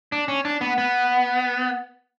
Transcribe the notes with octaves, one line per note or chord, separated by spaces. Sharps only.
D4
C#4
D4
B3
B3